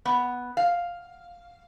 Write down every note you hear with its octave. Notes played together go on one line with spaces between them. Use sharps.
B3
F5